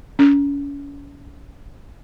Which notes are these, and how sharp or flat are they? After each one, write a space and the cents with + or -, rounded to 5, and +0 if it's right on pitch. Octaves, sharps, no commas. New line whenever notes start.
C#4 +35